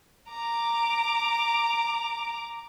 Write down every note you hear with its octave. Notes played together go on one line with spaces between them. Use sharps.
A#5 D6